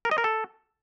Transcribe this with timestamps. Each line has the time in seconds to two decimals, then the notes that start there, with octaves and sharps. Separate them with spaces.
0.05 A#4
0.11 D#5
0.18 A#4
0.24 A4